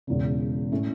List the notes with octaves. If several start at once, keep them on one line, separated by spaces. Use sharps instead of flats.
E1 E2 C#3
A2 A3 C#4